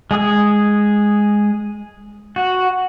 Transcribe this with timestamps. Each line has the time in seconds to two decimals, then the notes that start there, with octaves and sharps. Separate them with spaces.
0.11 G#3 G#4 D#6
2.36 F#4